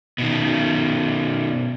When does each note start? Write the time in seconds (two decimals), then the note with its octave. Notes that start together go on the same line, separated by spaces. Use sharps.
0.18 B2 D#3